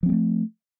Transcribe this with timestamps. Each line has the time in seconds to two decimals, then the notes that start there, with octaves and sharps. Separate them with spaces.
0.03 F3
0.06 C4
0.09 G#3
0.12 A3